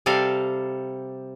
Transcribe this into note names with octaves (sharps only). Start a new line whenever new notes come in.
C3 G3 A4 F5